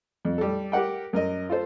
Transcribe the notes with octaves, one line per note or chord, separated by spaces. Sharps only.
F2
G3 A4
G4 A#4 F#5 G5
F#2 A#4 D#5
F4 A4 C5